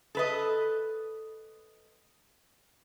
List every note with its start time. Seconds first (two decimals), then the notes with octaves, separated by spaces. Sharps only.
0.15 A4 B4 D#5